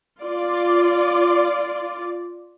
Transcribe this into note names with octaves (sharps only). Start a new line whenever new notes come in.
F4 D5